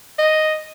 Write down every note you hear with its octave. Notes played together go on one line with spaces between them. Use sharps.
D#5